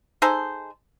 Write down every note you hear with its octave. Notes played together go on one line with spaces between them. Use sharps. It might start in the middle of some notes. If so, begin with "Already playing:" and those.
D#4 G#4 A4 C5